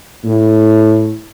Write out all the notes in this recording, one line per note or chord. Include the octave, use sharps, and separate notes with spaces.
A2